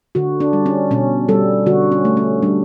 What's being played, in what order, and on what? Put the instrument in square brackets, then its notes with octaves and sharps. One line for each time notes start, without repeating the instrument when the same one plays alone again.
[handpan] D3 F#4
D4
G3
C#4
B2 C#4
G3 A4
D3 F#4
C#4
A3
C#4
G3 D4